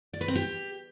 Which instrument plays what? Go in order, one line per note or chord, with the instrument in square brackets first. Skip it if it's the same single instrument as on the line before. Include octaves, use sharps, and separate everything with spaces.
[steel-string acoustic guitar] D5
B4
C4
G4